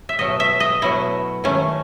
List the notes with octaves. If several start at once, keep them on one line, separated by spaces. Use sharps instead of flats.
E5
B2 F#3 A3 D#5
E5
D#5
B2 F#3 A3 E4
D#3 A3 C#4